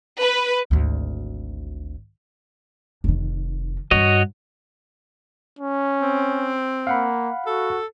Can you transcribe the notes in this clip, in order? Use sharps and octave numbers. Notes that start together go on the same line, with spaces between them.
B4
G#1 D2
F1 D#3
G2 F#4 C#5 D#5
C#4
C4
A#3 F5 F#5 B5
F#4 A4